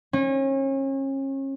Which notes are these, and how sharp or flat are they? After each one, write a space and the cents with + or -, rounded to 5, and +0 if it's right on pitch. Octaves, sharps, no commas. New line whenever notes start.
C#4 -35